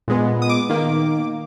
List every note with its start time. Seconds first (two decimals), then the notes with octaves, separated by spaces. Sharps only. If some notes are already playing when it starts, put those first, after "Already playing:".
0.08 A#2 G#3 B3
0.42 D#6
0.49 D6
0.69 D#3 A#3